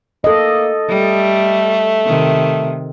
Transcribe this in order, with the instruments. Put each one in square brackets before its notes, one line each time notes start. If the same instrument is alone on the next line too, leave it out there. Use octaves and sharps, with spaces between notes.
[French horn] A#3 [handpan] A4 D#5
[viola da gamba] G3 [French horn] A3
[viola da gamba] C3 D#3